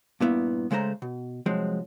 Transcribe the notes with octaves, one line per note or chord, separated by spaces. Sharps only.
G2 A#2 B3 E4
C#3 G#3 A3 C5 A#5
B2
C2 F3 F#3 G#3 C4